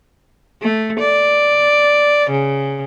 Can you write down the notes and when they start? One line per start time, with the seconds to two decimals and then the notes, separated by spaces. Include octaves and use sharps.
0.62 A3
1.00 D5
2.31 C#3